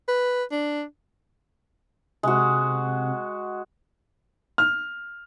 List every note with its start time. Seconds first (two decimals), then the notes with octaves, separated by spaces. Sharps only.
0.08 B4
0.52 D4
2.23 C3 G#3 F#4
4.58 F6